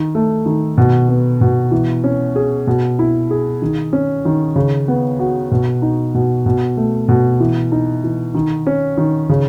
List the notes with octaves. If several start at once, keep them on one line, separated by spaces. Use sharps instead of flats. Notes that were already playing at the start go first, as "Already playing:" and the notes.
Already playing: D#3
A3
D#3
B2
B3
B2
E3
C#4
G#4
B2
E4
G#4
D#3
C#4
D#3
C#3
B3
F#4
B2
D#4
B2
B2
A3
B2
E3
D#4
E3
D#3
C#4
D#3
C#3